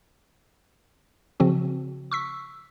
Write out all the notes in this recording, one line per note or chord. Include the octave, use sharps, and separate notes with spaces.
C#3 F3 C4 F#4
C#6 E6 B6